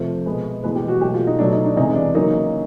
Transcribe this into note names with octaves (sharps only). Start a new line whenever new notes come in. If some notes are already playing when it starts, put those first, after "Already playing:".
Already playing: F2 C3 F3 A3 C5
B2 G#3 B3
E2 B2 G#3 B3 B4
G4
F#4
B2 F#3 A3 G4
F4
D#4
B2 F#3 A3 D4
D#4
D4
E2 C3 E3 G#3 D#4
D4
C#3 F#3 A#3 D#4